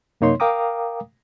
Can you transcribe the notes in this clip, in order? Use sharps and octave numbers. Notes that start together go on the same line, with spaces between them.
F#2 C3 A#3 D#4 C#5 C6
A#4 F5 G5 A#5 D6 D#6